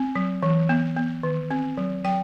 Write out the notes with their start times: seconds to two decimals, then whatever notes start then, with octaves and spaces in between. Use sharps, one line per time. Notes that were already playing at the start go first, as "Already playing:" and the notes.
Already playing: C4
0.16 F#3
0.43 E3
0.69 B3
0.97 B3
1.23 D#3
1.50 C4
1.77 F#3
2.04 F#3 G5